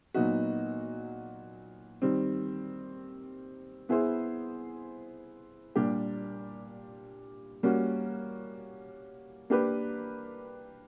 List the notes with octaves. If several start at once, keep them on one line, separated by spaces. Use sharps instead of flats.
A#2 F#3 B3 D#4 F#4
D#3 G3 C4
B3 E4 G#4 C5
A#2 G3 A#3 D4 G4
G3 A#3 C#4 F#4
A#3 D4 G4 B4